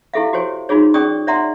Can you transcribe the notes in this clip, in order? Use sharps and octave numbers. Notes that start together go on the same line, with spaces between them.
E4 G4 A4 E5 F5
F#4 G4 C5 C#5 G#5
D#4 F4 F#4 G#4 C#5
C#4 G#4 D5 G5 C#6 D#6
C#5 D5 E5 F#5 A#5 C6